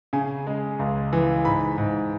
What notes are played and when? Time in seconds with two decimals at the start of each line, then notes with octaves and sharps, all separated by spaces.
0.13 C#3 G#5
0.47 G#3
0.79 C#2
1.13 E3
1.45 G#2 B5
1.78 G#2